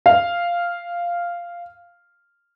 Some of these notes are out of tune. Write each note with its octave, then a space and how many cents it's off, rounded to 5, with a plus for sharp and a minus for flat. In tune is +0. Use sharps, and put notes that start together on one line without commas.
F5 -5